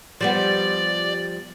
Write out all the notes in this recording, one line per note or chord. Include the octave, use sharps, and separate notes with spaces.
F3 G3 B3 D5